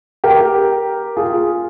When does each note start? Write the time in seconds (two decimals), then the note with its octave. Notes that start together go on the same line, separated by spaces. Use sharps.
0.24 G4 A#4
1.17 F4 G#4